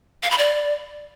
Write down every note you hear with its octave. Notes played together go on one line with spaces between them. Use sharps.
F5
B5
D5